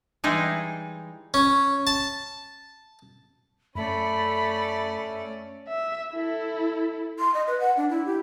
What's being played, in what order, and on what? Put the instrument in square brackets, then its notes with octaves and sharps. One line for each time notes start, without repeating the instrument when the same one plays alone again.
[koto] E3 G3 G#3 D#4 E4
[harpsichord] C#4
A5
[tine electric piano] F#2 [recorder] A3 [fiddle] C#4 D5 [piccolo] B5
[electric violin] E5
E4 A4
[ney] C6
D#5
B4
F#5
D4
E4
G4